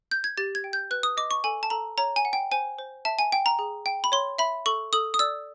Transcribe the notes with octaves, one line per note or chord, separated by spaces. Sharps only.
G6
G#6
G4 A6
G#6
G5
G6
B4 F#6
D#6
D#5 D6
C#6
A4 G#5
A5
A4 A#5
C#5 A#5
G#5
F#5
G5
C5 G#5
C5
E5 A5
G#5
G5
A#5
G#4
G5
B5
C#5 C6
E5 B5
A4 C#6
A4 D#6
D#6
D5 E6